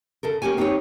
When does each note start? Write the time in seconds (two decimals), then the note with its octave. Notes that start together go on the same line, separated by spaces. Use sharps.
0.23 C#3 A4 A#4
0.42 A#3 C#4 G4 C#5 G#5
0.57 C4 D#4 G4 A#4 B4 C#5